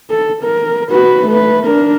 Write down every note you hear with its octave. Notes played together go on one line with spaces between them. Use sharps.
A4
A#4
F#4 B4
A3 B4
D4 A#4